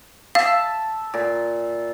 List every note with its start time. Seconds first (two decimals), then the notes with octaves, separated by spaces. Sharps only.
0.35 E5 F5 A5
1.14 A#2